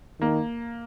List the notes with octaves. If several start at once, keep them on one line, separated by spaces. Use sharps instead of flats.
D#3 A#3